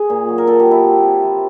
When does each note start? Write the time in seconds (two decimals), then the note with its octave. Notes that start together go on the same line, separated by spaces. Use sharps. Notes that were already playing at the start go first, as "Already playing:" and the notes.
Already playing: G#4
0.10 A#2
0.29 F#3
0.38 A#4
0.47 A#2 A4
0.60 G4
0.65 F#3
0.71 E4
0.84 C3
1.03 C3
1.22 F3